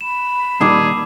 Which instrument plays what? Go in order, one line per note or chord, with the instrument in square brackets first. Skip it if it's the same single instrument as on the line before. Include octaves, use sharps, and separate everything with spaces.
[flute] B5 [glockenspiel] E7
[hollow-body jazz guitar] A#2 D#3 G3 [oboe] G#4 [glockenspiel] A5 D6 E6